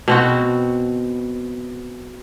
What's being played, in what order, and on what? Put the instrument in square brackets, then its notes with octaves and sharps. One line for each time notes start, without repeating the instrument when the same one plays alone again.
[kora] B2 C4 F#4